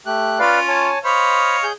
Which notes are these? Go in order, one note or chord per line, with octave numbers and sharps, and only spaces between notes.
A3 G4 F#6
C#4 F4 B4 D5 F5
C#5 G#5 A5
C5 C#5 D#5 F5 B5
G#4 G6